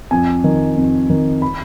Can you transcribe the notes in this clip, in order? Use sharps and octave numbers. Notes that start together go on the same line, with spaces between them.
F2 G#5
D#3
F2
D#3
B5